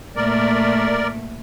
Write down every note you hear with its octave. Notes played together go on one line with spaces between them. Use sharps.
A#2 A3 A#4 D5